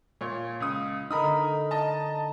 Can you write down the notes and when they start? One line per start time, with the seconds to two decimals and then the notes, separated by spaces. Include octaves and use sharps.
0.21 A#2 C#5
0.60 C#2 D#6
1.11 D3 D#4 A#4 B5 D#6
1.71 D#5 A5